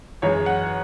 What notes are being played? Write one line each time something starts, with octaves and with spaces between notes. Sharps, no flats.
F#2 E3 G#3 C#5
F#5